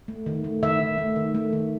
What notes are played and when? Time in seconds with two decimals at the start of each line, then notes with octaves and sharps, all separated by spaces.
0.08 A3
0.26 D#3
0.44 A3
0.63 D#3 E5
0.80 D#3
0.98 A3
1.16 D#3
1.35 A3
1.53 D#3